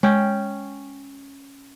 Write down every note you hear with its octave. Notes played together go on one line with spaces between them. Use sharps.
G#3 C#4 G5